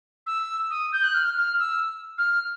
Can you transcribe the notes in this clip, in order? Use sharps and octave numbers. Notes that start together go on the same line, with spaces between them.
E6
D#6
G6
F#6
F6
F6
E6
F6